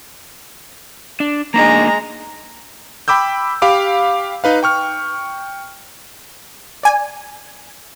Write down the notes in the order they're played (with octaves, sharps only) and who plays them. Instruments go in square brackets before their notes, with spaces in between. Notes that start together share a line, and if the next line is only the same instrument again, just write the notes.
[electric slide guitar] D4
[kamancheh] G#3 A#5 [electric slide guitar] A#3 D4 D#4
[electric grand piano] G5 B5 D6 E6 G6
G4 F5 B5 D6
D#4 B4 F5
G5 C#6 F6
[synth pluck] D5 G#5